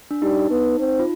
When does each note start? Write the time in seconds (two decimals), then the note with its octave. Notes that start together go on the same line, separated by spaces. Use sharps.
0.11 D4
0.22 G3 D#4
0.50 B3
0.79 C4
0.99 F4